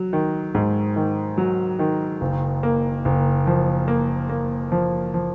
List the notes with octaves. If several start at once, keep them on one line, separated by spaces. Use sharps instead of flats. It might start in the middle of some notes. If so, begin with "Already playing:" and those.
Already playing: F#3
D#3
G#2
D#3
F#3
D#3
F#1
A#3
F#1
F3
A#3
A#3
F3
F3